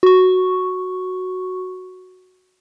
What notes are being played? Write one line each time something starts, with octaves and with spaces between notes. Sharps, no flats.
F#4 C#6